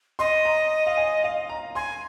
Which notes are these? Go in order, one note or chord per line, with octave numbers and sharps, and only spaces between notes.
D#5 C6
A#5
F5
G#5
F5
A#5
G#5 C6